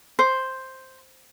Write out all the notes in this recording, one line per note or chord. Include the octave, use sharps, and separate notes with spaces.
C5